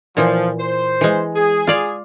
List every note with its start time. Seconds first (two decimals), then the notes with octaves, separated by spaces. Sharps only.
0.17 A#2 E3 F3
0.60 C5
1.01 E3 G#3
1.35 G#4
1.67 F4 D5 F5